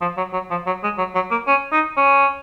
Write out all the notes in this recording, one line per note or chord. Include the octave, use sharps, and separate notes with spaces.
F3
F#3
F#3
F3
F#3
G#3
F#3
F#3
A#3
C#4
D#4
C#4